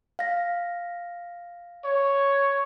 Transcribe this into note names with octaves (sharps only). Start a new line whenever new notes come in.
F5 A#6
C#5